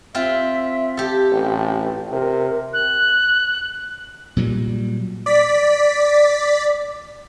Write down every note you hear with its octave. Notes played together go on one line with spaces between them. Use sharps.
C4 F4 E5
G4 A4
A1 G5
C3 A#4
F#6
A#2 F#3 G3
D5 B6